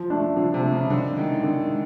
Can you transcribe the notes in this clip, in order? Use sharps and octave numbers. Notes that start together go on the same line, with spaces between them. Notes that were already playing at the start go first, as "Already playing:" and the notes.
Already playing: F3
A3 D4
D3 F3
C3
A3 D4
C#3
D3 D#3
D#3 G#3 C#4 E4
D3 D#3
G#3